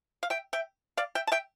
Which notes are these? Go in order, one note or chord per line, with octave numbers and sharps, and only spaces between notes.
F5
E5 G5
E5 G5
D5 F5
E5 G5
A5
E5 G5